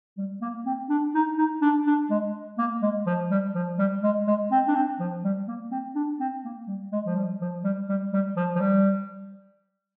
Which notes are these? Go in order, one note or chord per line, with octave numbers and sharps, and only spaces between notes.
G3
A#3
C4
D4
D#4
D#4
D4
D4
G#3
A#3
G#3
F3
G3
F3
G3
G#3
G#3
C4
D4
C4
F3
G3
A#3
C4
D4
C4
A#3
G3
G#3
F3
G3
F3
G3
G3
G3
F3
F3
G3